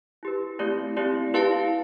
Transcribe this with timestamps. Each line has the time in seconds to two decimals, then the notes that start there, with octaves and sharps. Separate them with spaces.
0.23 E4 G4 B4
0.59 A3 C4 E4 G4 D5
0.97 A3 C4 E4 G4 D5
1.34 E4 G4 B4 F5 A5